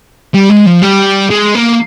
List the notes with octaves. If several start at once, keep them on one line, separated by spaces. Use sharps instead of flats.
G3
G#3
F3
G3
G#3
A#3